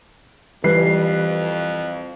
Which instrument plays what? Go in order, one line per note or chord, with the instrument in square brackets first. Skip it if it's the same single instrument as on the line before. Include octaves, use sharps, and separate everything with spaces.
[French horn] F2 [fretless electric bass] E3 [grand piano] G3 B4 C7